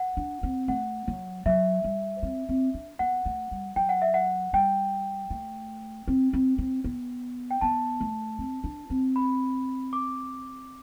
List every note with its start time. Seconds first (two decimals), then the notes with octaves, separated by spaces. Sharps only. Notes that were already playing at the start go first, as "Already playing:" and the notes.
Already playing: F#5
0.17 D4
0.43 C4
0.68 A3 F#5
1.08 F#3
1.46 F#3 E5
1.84 G3
2.23 C4
2.49 C4
2.74 D4
2.99 B3 F#5
3.26 A3
3.51 G3
3.76 F#3 G5
3.89 F#5
4.02 E5
4.14 F#5
4.53 G3 G5
5.30 A3
6.08 C4
6.33 C4
6.58 C4
6.84 B3
7.51 G5
7.61 B3 A5
8.00 A3
8.38 C4
8.64 D4
8.90 C4
9.16 B5
9.93 D6